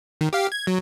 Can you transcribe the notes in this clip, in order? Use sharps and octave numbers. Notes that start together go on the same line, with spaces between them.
D#3
G4 F5
G#6
F#3